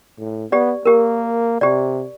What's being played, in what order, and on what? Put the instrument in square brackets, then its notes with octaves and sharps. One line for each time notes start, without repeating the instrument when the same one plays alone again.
[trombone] A2
[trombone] B3 [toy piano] G4 D5
[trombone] A#3 [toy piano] G4 A#4
[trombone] C3 [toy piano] G4 D5